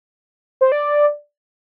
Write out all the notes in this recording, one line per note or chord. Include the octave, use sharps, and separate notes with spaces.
C5
D5